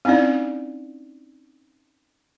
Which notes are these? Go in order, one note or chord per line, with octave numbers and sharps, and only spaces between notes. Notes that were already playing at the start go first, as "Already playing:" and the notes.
C4 C#4 D#4 E4 D5